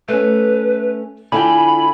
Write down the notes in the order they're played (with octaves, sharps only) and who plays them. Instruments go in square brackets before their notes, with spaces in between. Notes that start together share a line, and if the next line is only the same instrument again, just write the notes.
[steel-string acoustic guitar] A3 C#4 [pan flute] B4
[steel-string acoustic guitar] D3 F4 G5 [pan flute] E4 [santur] G#5 [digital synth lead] B5